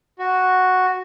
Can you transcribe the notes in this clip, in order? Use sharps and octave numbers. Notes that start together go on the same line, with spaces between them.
F#4